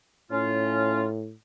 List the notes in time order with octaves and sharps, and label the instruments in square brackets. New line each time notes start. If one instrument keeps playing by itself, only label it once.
[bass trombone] A2 [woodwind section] C#4 F4